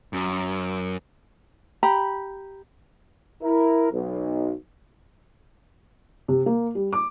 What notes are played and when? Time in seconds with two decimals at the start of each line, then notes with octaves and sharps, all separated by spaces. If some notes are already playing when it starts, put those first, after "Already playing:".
0.13 F#2
1.83 G4 A#5 B5
3.42 E4 A#4
3.91 B1
6.28 C3
6.46 A#3
6.75 G3
6.93 D6